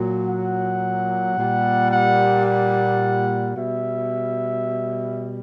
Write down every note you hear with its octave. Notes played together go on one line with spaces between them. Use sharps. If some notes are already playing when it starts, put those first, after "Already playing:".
Already playing: A#2 F#3
F#5
A#2 G3
F#5
F#5
B2 G3 E5